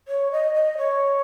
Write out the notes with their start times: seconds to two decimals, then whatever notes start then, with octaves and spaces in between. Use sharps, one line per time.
0.08 C#5
0.32 D#5
0.54 D#5
0.78 C#5